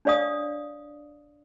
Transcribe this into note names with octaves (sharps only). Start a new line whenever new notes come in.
D4 C#5 D5 F5 D#6